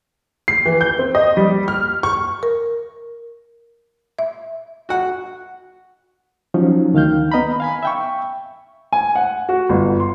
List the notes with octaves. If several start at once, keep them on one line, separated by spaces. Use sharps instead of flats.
C7
E3
G6
C4
D#5
G3
F6
C#6
A#4
E5
F#4 F#5
F3 F#3 C#4 D#4
D2 D#3 F5 F6 G6
B3 D#5 A#5 B5
F5 G#5 B5
E5 G5 C#6
G#5
F#5
F#4
G1
C6